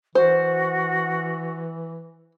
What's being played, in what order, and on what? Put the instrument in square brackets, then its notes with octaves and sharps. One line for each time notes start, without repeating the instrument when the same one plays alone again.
[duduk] E3 [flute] F#4 [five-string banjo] C5